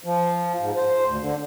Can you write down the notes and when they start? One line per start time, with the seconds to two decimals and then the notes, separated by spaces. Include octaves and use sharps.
0.04 F3
0.59 G#2
0.76 C5
1.05 D2
1.20 D3